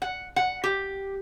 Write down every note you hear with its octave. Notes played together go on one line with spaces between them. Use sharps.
F#5
F#5
G4